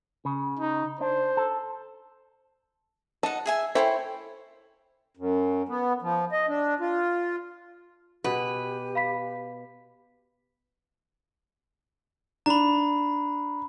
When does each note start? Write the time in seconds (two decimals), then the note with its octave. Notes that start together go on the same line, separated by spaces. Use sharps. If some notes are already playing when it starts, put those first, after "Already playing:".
0.25 C#3
0.59 D#4
1.01 D4 C5
1.37 A4
3.23 D#4 F#5 A5
3.46 G#4 E5 G#5
3.75 E4 A4 C5 C#5 G5 C6
5.17 F#2
5.69 B3
6.02 F3
6.32 D#5
6.48 D4
6.80 F4
8.24 B2 G4 G#4 B4 F#5
8.95 F5 B5 B6
12.46 D4 A#5 B5